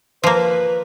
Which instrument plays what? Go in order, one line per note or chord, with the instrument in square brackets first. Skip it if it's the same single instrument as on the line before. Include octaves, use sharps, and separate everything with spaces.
[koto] F3 A#3 [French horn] B4